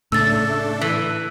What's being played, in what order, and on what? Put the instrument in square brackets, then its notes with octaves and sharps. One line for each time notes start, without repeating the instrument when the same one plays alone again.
[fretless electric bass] A2 C#3 [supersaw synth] A3 D4 A4 [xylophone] E6 A6
[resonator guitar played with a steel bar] E3